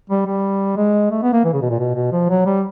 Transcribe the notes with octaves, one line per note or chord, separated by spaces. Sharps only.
G3
G3
G#3
A3
B3
A#3
E3
C#3
B2
A#2
B2
B2
F3
F#3
G3